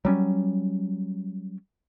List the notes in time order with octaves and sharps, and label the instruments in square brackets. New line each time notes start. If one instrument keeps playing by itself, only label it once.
[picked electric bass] F#3 G3 C#4